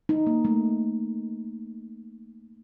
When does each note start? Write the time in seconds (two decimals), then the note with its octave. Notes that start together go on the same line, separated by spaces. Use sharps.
0.09 D#4
0.27 A#3
0.45 A3